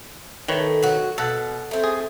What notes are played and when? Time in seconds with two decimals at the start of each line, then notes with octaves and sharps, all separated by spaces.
0.48 A2 D#3 B4 C#5
0.83 F#3 F#4
1.18 B2 A4 F#5
1.71 A3 C4
1.84 G#4